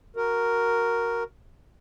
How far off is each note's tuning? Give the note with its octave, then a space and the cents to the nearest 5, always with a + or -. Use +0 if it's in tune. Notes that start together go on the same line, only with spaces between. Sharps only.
F#4 +0 A#4 +0